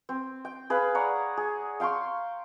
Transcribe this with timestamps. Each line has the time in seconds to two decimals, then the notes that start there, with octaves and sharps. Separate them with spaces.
0.09 C4
0.45 G5
0.70 G#4 B4 F5
0.95 C#5 D5 F#5 A#5
1.37 G#4
1.80 F5 G5 C6 C#6